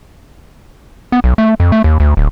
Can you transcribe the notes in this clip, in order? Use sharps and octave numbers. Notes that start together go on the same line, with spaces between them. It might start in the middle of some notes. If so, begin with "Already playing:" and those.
B3
B1
A3
F2
A3
D#2
D2
D1